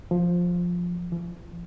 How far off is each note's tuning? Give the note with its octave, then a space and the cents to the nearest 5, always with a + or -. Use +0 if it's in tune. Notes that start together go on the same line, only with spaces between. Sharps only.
F3 +10
F3 -45